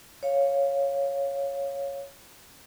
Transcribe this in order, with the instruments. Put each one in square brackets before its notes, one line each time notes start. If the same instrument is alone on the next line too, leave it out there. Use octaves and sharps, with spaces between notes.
[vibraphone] C#5 F5